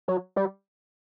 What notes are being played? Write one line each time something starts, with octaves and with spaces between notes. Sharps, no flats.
F#3
G3